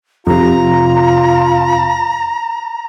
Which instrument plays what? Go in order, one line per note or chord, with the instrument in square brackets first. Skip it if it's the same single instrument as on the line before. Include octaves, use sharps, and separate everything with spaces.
[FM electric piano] F2 C3 [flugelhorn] F4 [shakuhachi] A#5